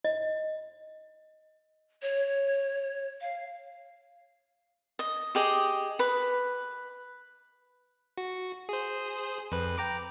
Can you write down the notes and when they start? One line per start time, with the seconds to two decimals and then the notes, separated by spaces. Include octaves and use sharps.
0.05 D#5
2.02 C#5
3.21 F5
4.99 D#5
5.35 G4 G#4 D#5
5.99 B4
8.18 F#4
8.69 G#4 C5
9.52 F2 B4
9.78 G5 A#5 D6